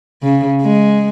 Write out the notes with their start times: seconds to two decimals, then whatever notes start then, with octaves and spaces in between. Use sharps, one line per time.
0.23 C#3
0.61 G#3